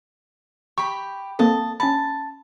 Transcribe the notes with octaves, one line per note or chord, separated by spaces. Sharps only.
G4 B5 C#6
A#3 C4 A4 D#5 A5
C#4 A5 B5